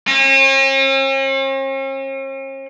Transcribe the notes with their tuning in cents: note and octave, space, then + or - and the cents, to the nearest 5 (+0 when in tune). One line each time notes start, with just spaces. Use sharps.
C#4 -45